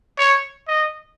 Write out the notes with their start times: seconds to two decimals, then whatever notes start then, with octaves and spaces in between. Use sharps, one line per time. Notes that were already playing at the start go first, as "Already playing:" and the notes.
0.18 C#5
0.68 D#5